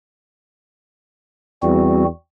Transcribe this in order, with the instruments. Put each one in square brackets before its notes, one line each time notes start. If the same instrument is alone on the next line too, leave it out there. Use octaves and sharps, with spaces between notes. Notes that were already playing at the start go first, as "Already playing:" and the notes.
[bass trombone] E2 [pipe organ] G3 C4 F#4